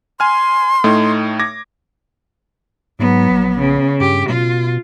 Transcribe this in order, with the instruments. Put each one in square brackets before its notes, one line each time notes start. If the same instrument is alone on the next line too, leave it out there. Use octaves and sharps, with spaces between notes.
[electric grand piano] G#5 F6 [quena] C6
[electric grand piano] A2 A3 D#4
D6 G#6 A#6
[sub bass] G#2 [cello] F#3 B3
[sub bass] A#1
[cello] C#3
[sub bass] G2 [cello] G4
[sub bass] B2 [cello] F4